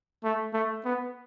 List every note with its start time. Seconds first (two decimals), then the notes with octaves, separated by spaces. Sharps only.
0.24 A3
0.53 A3
0.85 B3